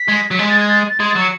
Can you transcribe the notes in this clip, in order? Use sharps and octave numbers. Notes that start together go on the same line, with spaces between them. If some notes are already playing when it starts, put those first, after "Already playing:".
Already playing: B6
G#3
F#3
G#3 B6
A6
G#6
A6
A6
G#3 G#6
A6
F#3 C#7